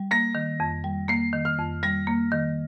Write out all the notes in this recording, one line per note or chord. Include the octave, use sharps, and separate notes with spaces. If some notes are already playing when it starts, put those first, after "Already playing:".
Already playing: G3
A#3 A#6
D#3
F2
G3
A#3 C7
D#3
F6
F2
G3 A#6
A#3
D#3